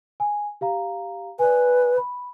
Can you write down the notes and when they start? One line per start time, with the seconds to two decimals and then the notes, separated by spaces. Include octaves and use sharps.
0.20 G#5
0.61 G4 F5 A#5
1.39 B4 D5 G#5
1.97 B5